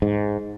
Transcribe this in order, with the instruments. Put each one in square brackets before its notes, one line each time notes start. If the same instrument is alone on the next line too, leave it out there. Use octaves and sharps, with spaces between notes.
[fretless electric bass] G#2